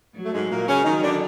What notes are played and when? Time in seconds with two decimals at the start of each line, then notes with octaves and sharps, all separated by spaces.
0.15 F#3
0.25 A3
0.33 G#2 G#3
0.50 A#2 A#3
0.67 C#3 C#4
0.85 D#3 F#3 D#4
1.03 D3 D4